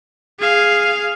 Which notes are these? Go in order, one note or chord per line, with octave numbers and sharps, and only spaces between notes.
G#4 F5